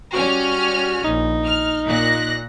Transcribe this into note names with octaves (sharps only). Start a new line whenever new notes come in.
G3 C#4 F#4 F6
A#1 D#4
F6
A#2 F#6 A#6